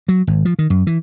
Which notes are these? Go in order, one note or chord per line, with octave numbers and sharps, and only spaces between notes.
F#3
G#1
F3
D#3
F#2
E3